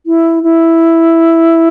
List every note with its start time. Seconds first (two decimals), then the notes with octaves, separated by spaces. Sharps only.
0.06 E4
0.43 E4